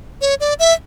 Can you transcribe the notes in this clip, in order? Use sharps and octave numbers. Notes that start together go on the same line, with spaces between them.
C#5
D5
E5